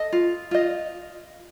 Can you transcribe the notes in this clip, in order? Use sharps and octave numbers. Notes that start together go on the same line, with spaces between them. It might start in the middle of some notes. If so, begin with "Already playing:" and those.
Already playing: A4 D#5
F4
F4 D#5